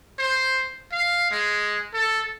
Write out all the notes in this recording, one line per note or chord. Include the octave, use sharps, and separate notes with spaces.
C5
F5
G#3
A4